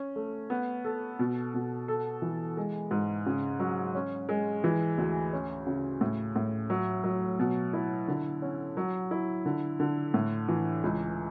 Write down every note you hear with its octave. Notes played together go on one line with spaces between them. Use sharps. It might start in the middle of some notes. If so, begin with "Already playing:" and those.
Already playing: C#4
A3
B3
A4
B2
B2
A4
E3
G#3
G#2
C#3
F#3
C#4
G#3
E3
D2
C#4
C#3
A2
A2
F#3
F#3
B2
E4
D3
C#4
F#3
E4
D3
D3
A2
E3
C#2